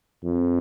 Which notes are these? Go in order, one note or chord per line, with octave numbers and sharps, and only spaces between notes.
F2